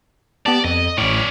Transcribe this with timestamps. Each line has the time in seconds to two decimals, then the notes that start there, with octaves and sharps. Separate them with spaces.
0.46 B3 G4 D5 A5
0.65 F2 D#5
0.98 A1 A2 C#4 D5